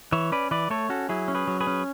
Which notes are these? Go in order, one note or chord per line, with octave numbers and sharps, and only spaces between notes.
E3 C#5 E5
C#4 B4 D5
E3 B4 D5
A3 A4 C#5
C#4 F#4 A4
F#3 E4 G#4
C#4
G#4 B4
F#3
G#4 B4
C#4